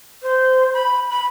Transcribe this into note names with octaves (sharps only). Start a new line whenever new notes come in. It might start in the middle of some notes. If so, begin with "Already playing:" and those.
C5
B5
B5